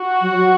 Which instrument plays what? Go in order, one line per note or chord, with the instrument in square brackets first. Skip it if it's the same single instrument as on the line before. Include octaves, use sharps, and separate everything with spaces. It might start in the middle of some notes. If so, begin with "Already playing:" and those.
Already playing: [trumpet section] F#4
[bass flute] F#3
F#3